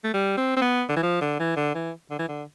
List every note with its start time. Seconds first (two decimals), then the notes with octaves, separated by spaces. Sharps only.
0.04 A3
0.14 G3
0.37 C4
0.57 C4
0.62 B3
0.89 D3
0.96 E3
1.03 F3
1.22 D3
1.39 E3
1.56 D3
1.75 E3
2.11 D3
2.19 E3
2.29 D3